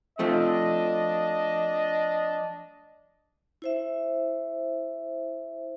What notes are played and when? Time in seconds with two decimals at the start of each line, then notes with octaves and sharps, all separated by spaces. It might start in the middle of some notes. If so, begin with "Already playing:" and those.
0.19 F3 A3 C4 D4 D#5
3.62 E4 C5 E5